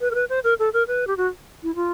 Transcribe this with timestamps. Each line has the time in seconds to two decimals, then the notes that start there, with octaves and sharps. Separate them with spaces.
0.01 B4
0.11 A#4
0.15 B4
0.29 C5
0.44 A#4
0.59 A4
0.73 A#4
0.87 B4
1.07 G4
1.17 F#4
1.63 E4
1.75 F4